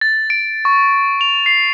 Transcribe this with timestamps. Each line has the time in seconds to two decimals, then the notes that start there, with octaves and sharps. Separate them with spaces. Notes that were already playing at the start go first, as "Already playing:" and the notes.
0.01 A6
0.30 D7
0.65 C#6
1.21 F7
1.46 C7